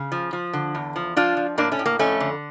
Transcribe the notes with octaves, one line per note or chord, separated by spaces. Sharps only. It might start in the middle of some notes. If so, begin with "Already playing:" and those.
Already playing: C#3
F3
F3
D3
E2
F3
F3 D4 F4
F3
A2 A#3 D4
A3 C#4
A2
A#3
F2 A3 C#4
D3